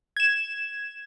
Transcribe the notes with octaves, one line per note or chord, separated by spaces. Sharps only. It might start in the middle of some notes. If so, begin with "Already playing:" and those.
G#6 E7